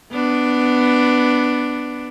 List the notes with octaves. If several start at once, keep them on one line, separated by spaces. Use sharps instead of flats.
B3 D4